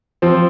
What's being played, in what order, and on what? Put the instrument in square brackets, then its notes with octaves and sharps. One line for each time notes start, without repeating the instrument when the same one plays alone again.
[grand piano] F3 C4